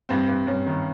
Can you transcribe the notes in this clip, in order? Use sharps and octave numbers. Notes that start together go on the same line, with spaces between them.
G2 C4
G2
G2 C#4
D#3